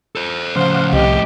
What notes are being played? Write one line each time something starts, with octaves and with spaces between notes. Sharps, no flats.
A4 C5
A2 C#3 F3 C5 F5 F#5
C2 G4 D#5